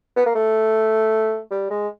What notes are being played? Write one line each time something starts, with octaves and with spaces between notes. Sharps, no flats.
B3
A#3
A3
G3
G#3